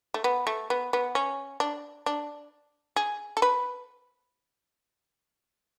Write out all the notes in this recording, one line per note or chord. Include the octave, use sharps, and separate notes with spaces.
A3
B3
A3
B3
B3
C#4
D4
D4
G#4
A4
B4